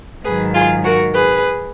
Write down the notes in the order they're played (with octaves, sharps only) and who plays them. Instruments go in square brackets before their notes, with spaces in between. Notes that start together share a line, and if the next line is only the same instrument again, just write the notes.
[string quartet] G#2 D#3 F#3 G#4 B4
F4 G#4
F#4 A#4
G#4 B4